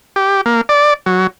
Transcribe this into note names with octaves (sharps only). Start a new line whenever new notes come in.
G4
A#3
D5
F#3